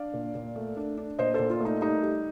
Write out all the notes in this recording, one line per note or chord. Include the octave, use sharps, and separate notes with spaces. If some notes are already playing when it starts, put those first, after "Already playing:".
Already playing: D4 D5 F5
A#2
A#2
A3
D4
D4
A#2 C5 D#5
A#2 A4 C5
F4
A3 D#4
G3 D#4
G3